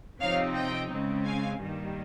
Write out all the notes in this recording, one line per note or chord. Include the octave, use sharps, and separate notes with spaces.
C3 F3 C4 D#4 C#5 F5
D#5 G5
C#3 G#3 C4
F5 G#5
G2 D#3 G3 A#3